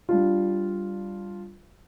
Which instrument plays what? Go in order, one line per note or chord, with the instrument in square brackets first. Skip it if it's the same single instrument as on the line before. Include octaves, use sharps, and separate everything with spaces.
[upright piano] G3 D4 F4